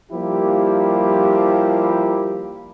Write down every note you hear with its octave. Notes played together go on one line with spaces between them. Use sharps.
F3 G3 A#3 E4 G4